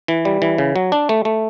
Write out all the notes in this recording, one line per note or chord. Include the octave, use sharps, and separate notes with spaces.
E3
G3
E3
C#3
F#3
D4
A3
A3